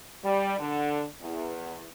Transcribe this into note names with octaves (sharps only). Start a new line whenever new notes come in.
G3
D3
E2